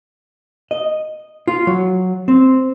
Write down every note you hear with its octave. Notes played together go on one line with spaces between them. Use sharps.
D#5
F4
F#3
C4